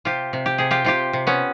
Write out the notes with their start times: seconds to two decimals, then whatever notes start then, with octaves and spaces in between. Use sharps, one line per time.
0.05 C3 F4 G4
0.33 C3
0.46 G4
0.58 C3 G#4
0.71 F4 G4
0.85 C3 F4 G4
1.13 C3
1.27 B3 C#4